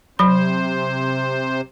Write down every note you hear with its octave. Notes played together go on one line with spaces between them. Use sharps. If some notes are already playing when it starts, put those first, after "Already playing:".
C3 F#3 C5 B5